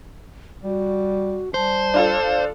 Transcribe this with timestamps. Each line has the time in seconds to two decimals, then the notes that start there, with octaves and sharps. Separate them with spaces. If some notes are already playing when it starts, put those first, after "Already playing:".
0.64 G3 F#4
1.54 G3 C5 A5
1.94 D4 F4 A4